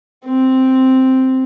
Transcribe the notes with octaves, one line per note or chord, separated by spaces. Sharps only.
C4